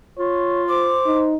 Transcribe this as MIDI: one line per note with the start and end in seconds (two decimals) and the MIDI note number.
0.18 0.98 65
0.18 0.63 73
0.69 1.33 72
0.69 1.20 86
1.06 1.36 63